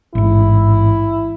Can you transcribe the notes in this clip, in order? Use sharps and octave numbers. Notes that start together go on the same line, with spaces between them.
A1 G#2 E4